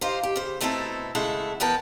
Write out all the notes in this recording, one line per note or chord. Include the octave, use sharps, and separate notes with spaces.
D#4 F4 G4 C5
G4
C#3 C5
B2 A3 C4 D#4 E4 A4
C#3 G#3 A3 E4 A4 F#5
E3 B3 A#4 G5 A5